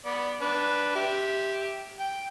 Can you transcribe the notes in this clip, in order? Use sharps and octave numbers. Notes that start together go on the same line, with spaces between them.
B3 D5
D4 B4
G4 E5
G5